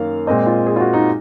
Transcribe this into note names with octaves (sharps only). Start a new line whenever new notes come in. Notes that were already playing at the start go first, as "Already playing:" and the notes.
Already playing: F#2 D#3 A#3 C#4 F5
A#2 G#3 C4 D#5
F4
G#4
F4
F#4
D#4